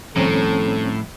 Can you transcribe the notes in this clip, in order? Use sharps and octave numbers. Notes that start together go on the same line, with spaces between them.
A2 D#3 F3 G3 C4 C#4 A4 A#5